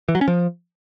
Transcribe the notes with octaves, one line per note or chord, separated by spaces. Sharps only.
E3
F#3
C#4
F3